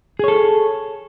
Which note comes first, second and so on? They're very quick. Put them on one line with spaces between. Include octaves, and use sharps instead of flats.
G#4 C#5 A4